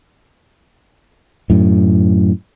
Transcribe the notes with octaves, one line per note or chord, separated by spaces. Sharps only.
F#2 A2